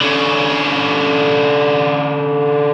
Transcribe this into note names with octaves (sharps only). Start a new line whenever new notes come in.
D3 C#4